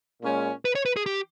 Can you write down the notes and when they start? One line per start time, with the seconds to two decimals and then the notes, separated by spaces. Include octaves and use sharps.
0.22 A#2 G#3 C#4
0.65 B4
0.75 C#5
0.86 B4
0.96 G#4
1.06 G4